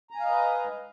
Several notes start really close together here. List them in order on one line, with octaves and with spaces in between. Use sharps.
A#5 G#5 F5 D#5 B4